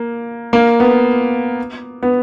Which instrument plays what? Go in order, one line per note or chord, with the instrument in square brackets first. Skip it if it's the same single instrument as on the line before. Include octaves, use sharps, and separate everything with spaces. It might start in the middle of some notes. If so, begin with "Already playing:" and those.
Already playing: [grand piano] A#3
A#3
B3
B3